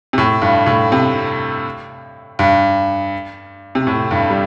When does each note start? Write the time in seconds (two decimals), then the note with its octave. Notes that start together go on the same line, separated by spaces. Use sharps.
0.13 C3
0.18 A2
0.42 G2
0.66 A2
0.92 C3
2.39 G2
3.75 C3
3.87 A2
4.11 G2
4.30 G3